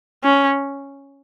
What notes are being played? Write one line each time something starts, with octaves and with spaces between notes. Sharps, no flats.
C#4